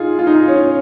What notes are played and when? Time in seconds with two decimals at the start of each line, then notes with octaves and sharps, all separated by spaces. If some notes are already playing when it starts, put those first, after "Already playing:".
Already playing: D#4 F4 G#4
0.19 F4
0.27 D#4
0.48 C#4